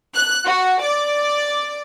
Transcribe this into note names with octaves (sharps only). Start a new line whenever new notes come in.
F#6
F#4
D5